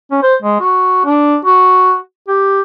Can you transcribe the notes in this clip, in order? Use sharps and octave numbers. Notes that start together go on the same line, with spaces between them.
C#4
C5
G#3
F#4
D4
F#4
G4